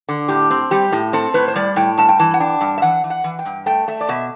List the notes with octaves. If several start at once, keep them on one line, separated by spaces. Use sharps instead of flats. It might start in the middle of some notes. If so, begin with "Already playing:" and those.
D3
A2 G4
C4
G3 G4
A2
C4 A4
A2 B4
C5
G3 D5
A2 G5
G2 A5
G5
E3 A5
F#5
D4 G5
G2
E5
E3 F#5
E3
F#5
E3
G5
G2
A3 G5
A3 E5
D5
B2 E5